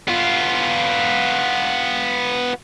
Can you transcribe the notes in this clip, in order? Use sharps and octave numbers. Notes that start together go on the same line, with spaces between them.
B3 F4